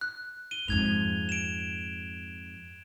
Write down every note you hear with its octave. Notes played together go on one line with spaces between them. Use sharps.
F#6
D#7 G7
F2 G#2 G#6 F7
D7 E7